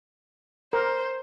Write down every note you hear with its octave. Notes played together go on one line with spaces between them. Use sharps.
A#4 C5